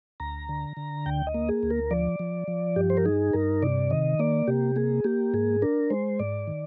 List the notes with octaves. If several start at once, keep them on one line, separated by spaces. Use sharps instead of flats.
D2 A#5
D3
D3
D2 G5
D#5
A#3
G#4
D2
A#4
F3 D5
F3
F3
G2 G4
C5
A#4
D#4 G#4
G2 A#4
C3 D5
D#3 D#5
A#3 D5
C3 G4
A#3 G#4
A#3 G4
G#2 G#4
D4 A#4
G#3 C5
G#2 D5
D#3